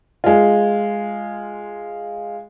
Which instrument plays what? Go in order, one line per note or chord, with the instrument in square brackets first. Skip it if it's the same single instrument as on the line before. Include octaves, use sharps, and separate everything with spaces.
[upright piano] G#3 F4